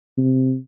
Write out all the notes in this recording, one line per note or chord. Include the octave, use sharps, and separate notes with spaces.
C3